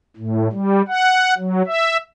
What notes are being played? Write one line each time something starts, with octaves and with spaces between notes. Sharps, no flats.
A2
G3
F#5
F#3
E5